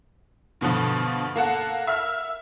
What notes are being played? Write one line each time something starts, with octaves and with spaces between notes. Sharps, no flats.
G2 B2 D3 F3
A#3 A4 F#5
E5 F6